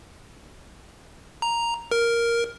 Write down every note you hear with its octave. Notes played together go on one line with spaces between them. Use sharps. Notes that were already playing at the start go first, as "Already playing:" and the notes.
A#5
A#4